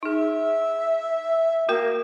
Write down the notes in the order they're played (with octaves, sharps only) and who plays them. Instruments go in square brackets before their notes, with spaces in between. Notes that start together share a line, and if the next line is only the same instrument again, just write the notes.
[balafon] D#4 G#4 [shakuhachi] E5
[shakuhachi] A#3 [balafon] F#4 A#4 G5